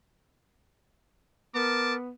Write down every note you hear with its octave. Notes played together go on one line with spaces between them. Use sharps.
B3 A#4 A5 D6